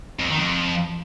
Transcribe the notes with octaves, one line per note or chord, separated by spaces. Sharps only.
F2
D#3
F2